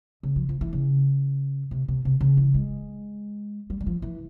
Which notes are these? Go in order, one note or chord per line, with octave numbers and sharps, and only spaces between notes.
C#3
F3
F3
E3
C#3
C3
C3
C3
C#3
E3
G#3
G3
G3
F3
E3